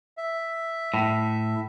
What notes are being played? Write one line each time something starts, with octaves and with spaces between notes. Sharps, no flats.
E5
A2